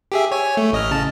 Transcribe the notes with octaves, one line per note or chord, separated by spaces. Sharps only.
G4 G#4 E5
C#5 G#5
A3
A1 D#5 F6
C#3 A5